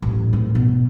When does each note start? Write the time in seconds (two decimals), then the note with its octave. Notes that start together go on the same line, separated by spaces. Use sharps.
0.02 A1 F#3
0.33 G#1 A2
0.55 B2